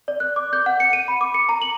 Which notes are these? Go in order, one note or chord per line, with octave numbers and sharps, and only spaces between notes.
D5
F#6
D6
G6
F#5
C#7
D#7
B5
D6
C#7
A#5
F#7